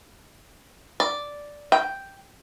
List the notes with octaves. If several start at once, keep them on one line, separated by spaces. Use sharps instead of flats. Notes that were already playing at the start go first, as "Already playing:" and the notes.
D5
G5